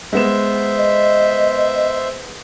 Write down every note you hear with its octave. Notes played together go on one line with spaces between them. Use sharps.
G#3 B3 C5 E5 E7
D#5